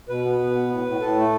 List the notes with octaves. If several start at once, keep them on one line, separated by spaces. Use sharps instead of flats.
B2 B4
B3
B2
B3
A2
A2
A2 A4
A3